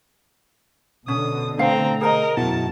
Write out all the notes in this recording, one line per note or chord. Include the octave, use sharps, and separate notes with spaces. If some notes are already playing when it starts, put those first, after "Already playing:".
B2 D3 C#4 D#6
A3 C4 F5 A#5
G#4 A#4 C5 D#5 A#5
F#2 B2 E4 F#4 A5